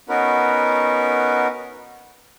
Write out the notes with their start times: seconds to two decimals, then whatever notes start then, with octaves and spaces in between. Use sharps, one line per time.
0.09 B3 C#4 D#4 F#4 A#4 B4